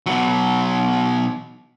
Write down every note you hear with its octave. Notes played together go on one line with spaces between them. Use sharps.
B2 F#3